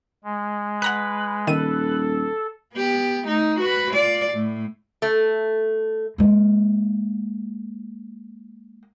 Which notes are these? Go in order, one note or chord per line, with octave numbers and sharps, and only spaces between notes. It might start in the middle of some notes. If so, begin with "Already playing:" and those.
G#3
B4 F#5 A#5 F#6
D#1 D#3 A4 D#7
B3 G4
A3 D#4
F#4 B4
F4 D5
A2
A3
G#3 A#3